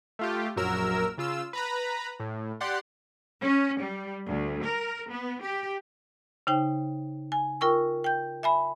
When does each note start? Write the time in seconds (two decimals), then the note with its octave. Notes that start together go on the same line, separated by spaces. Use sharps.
0.19 A3 F4 G4
0.56 A#1 F#2 F#3 A#4 E6
1.18 C#3 F4 E6
1.53 B4 A#5 B5
2.20 A2
2.61 G4 D5 F#5 C6
3.41 C#4
3.80 G3
4.27 D2
4.64 A#4
5.10 B3
5.42 G4
6.47 C#3 D#4 C5 G5
7.32 G#5
7.61 F4 A#4 G5 C#6 E6
8.04 G5 G6
8.43 E5 G#5 B5